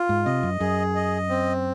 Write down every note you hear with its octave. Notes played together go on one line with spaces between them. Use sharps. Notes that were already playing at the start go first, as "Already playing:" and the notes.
Already playing: F4
G#2
C3 D#5
F#2
F#2 G#4
D#5
C4